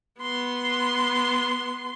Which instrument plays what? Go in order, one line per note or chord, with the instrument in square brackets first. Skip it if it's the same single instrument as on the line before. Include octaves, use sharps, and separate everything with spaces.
[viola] B3 C6